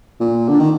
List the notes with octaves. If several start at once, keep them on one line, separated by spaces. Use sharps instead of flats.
A#2
D3
D#3